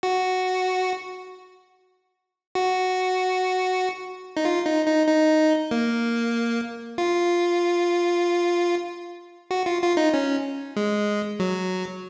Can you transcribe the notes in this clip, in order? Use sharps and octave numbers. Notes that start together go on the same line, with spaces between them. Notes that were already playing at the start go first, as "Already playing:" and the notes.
F#4
F#4
D#4
F4
D#4
D#4
D#4
A#3
F4
F#4
F4
F4
D#4
C#4
G#3
F#3